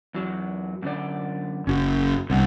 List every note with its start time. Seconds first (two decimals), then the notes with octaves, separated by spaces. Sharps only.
0.14 E2 F#3
0.82 F#2 D3 D5
1.67 F#1 C#4 F#4
2.30 C2 D3 B3